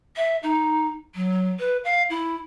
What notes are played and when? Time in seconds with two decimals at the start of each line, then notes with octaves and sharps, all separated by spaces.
0.16 E5
0.42 D#4
1.15 F#3
1.59 B4
1.84 F5
2.09 E4